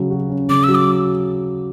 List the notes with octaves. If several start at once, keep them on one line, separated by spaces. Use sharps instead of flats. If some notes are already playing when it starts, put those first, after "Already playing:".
Already playing: C#3 F#3
F#4
C#4
C#3 D6
F#3 E6
D6